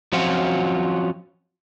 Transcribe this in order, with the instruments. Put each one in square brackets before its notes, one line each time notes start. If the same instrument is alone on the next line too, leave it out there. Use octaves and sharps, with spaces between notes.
[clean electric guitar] F3 F#3 C4 C#4 F4 F#4